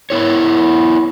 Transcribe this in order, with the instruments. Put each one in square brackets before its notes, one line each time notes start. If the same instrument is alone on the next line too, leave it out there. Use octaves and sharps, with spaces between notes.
[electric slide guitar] B3 E4 C#5